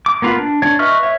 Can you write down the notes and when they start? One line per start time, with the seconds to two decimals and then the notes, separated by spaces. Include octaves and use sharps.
0.06 D6
0.22 A#3 B3 F4 A#4 B4
0.37 D4
0.62 D4 C#5
0.79 B4 D#5 E5 C#6 F6
1.03 C#5 E5